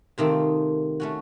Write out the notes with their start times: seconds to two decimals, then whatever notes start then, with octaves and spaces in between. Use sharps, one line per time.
0.18 C3 D#3 A3 C4 F4
1.00 A3 C#4 F#4